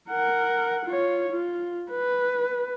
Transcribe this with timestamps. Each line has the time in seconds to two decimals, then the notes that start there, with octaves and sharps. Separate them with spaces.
0.10 A#4 F#5
0.85 F4 C#5
1.32 F4
1.91 B4